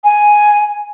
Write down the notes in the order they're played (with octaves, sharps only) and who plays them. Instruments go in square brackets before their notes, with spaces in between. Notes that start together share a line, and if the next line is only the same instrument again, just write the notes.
[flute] G#5